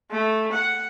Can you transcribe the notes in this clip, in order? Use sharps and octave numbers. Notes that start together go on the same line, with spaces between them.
A3
F#5